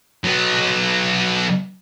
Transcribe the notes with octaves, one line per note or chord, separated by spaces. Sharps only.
F#3 B3